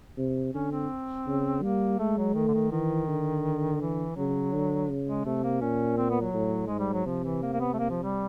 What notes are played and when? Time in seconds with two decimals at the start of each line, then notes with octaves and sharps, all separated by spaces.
0.17 C3
0.54 D3 C#4
0.72 C4
1.27 C#3
1.62 G3 A#3
1.99 G#3 A3
2.17 F#3
2.35 D#3 A3
2.48 D3
2.54 D#3
2.71 D#3 E3
3.08 D3
3.81 E3
4.16 C#3 F#3
4.53 D3
4.89 C#3
5.07 G#3
5.25 C3 A3
5.44 A#3
5.61 A#2 C#4
5.97 C4
6.10 B3
6.21 F#3
6.34 A2
6.67 G#2 G#3
6.79 G3
6.93 F#3
7.05 C3 F3
7.24 E3
7.43 A#3
7.53 A#3
7.60 B3
7.73 A3
7.79 A#3
7.90 F3
8.03 G3